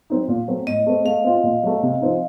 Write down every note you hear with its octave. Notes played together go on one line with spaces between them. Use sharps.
F#3 C4 D#4
A#2
F#3 A3 C4
A2 D#5
A3 C4
A3 F5
C4 F4
A#2
F#3 A3
C3
F3 C4 D#4